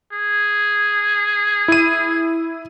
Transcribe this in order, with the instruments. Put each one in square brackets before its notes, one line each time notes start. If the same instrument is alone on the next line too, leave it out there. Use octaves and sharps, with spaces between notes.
[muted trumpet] G#4
[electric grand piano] E4 D#7